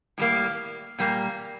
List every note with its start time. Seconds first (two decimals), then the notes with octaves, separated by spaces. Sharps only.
0.18 A2 G3 A#3
0.98 A#2 G3 A#3